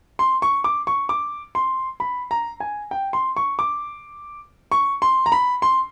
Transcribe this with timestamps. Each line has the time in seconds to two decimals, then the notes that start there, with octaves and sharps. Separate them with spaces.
0.19 C6
0.42 C#6
0.64 D6
0.87 C#6
1.09 D6
1.55 C6
2.00 B5
2.31 A#5
2.60 G#5
2.91 G5
3.13 C6
3.36 C#6
3.59 D6
4.72 C#6
5.02 C6
5.26 A#5
5.32 B5
5.62 C6